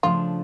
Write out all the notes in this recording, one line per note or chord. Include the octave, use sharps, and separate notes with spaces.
C#3 F3 A3 D4 F4